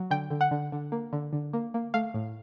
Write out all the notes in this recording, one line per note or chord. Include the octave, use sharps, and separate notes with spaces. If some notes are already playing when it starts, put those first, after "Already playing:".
Already playing: F#3
D3 G5
D3
F#5
D3
D3
A#3
D3
D3
A#3
A#3
A3 F5
A2